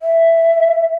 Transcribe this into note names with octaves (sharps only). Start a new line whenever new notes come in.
E5